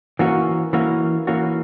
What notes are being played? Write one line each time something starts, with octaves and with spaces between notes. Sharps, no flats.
E3 A#3 C#4 F#4
E3 A#3 C#4 F#4
E3 A#3 C#4 F#4